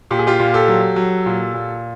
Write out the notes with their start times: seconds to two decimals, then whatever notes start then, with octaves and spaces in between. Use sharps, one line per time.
0.11 A#2 G4
0.19 G#4
0.27 F4 G4
0.40 A#2
0.54 G4 A4
0.68 F#3
0.96 F#3
1.26 A#2
1.54 A#2